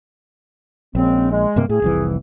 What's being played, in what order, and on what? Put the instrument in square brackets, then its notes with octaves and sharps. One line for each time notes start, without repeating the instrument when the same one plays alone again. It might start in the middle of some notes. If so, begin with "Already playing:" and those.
[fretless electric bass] A#1 [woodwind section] C#3 G#3 C4
[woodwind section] G#3
[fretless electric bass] G2 C3 A#3
[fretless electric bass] A2 [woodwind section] G#4
[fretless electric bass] F1 C2 E3